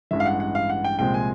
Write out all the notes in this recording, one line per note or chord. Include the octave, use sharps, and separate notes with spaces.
A1 G2 E3 G#3 E5
F5
F#5
F#5
F5
F#5
G5
C2 A#2 F3 G#3 C4 G5
G#5